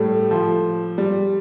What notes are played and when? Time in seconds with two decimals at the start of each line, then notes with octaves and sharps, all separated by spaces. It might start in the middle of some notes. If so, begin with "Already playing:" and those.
Already playing: A2 G3 A3
0.31 F3
0.98 G3